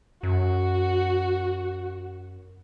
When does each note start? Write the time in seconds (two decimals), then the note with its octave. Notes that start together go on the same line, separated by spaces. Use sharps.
0.23 F#2 F#4